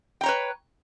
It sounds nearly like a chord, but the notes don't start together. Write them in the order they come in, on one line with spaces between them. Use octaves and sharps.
G5 A#5 C#5 B4